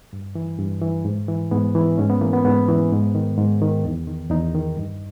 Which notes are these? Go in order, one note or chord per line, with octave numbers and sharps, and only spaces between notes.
G2
E3
G2
E3
G#2
E3
G#2 B3
E3
G#2 C#4
B3
E3 A#3
B3
G#2 B3
E3
G#2
D#3
G#2
D#3
E2
D#3
E2 D#4
D#3
G2